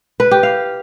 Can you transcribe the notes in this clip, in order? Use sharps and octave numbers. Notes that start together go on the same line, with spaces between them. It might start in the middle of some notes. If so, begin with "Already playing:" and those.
B4
G4
F5